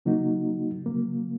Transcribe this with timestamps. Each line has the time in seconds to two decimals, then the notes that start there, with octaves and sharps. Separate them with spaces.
0.05 C#3 F#3 A#3 D#4 F#4
0.86 C#3 F#3 A#3